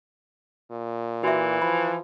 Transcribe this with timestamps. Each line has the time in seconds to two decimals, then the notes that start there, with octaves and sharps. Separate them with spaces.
0.71 A#2
1.23 E3 F#4 E5
1.62 F3 B5